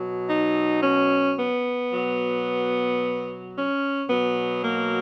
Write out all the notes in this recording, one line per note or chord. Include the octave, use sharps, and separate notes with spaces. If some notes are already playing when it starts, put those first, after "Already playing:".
Already playing: B2 F#3
D#4
C#4
B3
B2 F#3
C#4
B2 F#3 B3
A#3